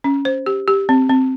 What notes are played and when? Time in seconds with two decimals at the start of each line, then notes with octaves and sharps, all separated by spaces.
0.04 C#4
0.25 C5
0.46 G4
0.68 G4
0.89 C4
1.09 C4